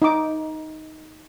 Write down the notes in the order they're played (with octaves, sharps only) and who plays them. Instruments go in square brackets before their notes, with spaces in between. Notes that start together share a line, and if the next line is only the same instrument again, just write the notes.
[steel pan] D#4 D6